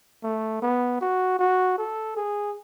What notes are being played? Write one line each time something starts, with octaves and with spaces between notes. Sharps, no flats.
A3
B3
F#4
F#4
A4
G#4